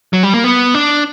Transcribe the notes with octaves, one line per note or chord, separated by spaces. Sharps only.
F#3
G3
A#3
B3
D4